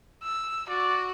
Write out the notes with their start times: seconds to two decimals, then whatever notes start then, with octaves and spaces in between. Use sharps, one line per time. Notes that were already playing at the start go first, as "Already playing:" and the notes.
0.22 E6
0.69 F#4 D5